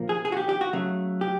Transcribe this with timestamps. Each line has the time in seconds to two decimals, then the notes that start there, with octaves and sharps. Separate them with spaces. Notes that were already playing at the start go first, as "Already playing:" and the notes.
Already playing: A#2 F3 A#3
0.09 G#4
0.25 G#4
0.32 F#4
0.37 G4
0.49 G4
0.61 F#4
0.73 C#3 F#3 A3
1.21 G4